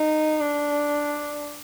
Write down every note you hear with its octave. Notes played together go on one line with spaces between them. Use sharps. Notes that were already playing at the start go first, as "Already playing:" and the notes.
Already playing: D#4
D4